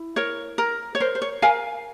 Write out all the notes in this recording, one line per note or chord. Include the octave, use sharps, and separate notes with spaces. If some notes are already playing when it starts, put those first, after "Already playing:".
Already playing: E4
A#4 C#5
A#4
C#5
A#4 C5
C5
C#5
A#4 F5 G#5